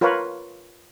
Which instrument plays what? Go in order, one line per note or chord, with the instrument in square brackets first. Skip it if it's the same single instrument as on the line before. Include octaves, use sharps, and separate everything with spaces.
[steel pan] F4 A#4 B4 C#5 F5